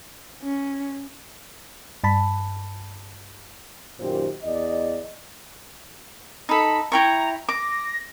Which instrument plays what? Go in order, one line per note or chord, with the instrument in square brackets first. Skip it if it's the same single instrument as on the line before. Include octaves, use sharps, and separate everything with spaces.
[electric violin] C#4
[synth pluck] G2 A5 B5
[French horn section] F#2 A#2 D#3 G4 C5
E2 D5 D#5
[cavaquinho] D#4 A4 [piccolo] B5
[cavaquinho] E4 G5 C#6 [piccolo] A#5
[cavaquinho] D6 [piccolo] A#6